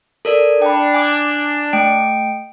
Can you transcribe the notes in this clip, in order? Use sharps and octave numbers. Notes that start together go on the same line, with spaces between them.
A4 A#4 D5
D4 G5 B5
G#5 D6
A3 G5 D7